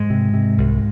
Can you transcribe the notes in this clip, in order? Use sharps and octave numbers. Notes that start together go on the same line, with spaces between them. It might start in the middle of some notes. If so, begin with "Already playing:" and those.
Already playing: G#2 G#3
C3
C3
C2